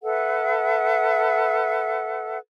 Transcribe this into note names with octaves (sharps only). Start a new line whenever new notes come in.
A4 B4 E5 F#5